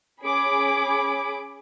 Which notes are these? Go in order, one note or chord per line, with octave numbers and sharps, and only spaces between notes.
C#4 G#4 B5 D6